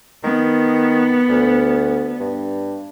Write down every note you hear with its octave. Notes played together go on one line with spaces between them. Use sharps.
D#3 B3
D2
G2